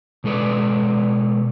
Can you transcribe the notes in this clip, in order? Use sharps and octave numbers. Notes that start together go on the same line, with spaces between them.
B2 G#3 A4 B4 D5